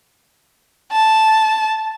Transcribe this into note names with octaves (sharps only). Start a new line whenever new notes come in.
A5